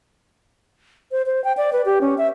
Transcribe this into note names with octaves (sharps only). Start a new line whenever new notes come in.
C5
C5
G5
D5
B4
G4
C#4
E5